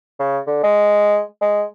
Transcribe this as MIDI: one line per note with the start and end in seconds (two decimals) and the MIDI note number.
0.20 0.40 49
0.47 0.62 50
0.63 1.22 56
1.41 1.65 56